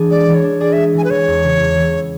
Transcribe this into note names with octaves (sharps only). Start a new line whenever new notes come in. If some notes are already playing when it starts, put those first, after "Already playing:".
Already playing: E3 D4 G#4
G#3 D5
E3
C#5
D4
G#4 D5
G#3 E5
E3 G#5
B4
E3 C#5
E2
C#3
E2
E3